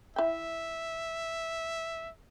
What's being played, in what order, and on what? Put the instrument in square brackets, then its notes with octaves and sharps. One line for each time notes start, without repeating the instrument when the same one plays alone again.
[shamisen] E4 G5 [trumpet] E5